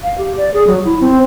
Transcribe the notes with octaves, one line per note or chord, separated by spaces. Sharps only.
F5
G4
D5
G#4
F#3
E4
C4